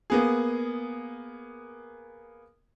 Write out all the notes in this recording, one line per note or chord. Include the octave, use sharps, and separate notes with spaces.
A#3 B3 G#4